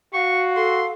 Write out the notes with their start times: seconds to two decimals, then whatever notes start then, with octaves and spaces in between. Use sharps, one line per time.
0.13 F#4 F5 C#6
0.56 A4 C6